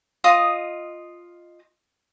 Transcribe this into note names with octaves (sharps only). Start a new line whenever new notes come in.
F4 D#5 D#6